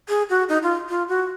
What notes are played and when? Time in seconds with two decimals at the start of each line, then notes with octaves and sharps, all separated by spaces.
0.09 G#4
0.30 F#4
0.49 D#4
0.63 F4
0.89 F4
1.09 F#4